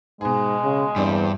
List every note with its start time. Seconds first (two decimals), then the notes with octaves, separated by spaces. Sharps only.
0.21 G#2 B2 G#3 G#4
0.63 C#3
0.96 E2 G2 C4 D4 C5